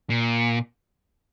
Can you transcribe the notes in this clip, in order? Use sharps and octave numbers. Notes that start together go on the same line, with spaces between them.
A#2